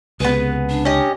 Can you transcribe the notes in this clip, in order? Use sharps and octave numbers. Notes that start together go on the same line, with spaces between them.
C#2 C3 B3 G#4 B4
D4
C#4 G4 D#5